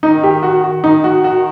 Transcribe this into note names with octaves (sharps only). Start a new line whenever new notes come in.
D#3 D#4
G4
F#4
F#4
D#3 D#4
F#4
F#4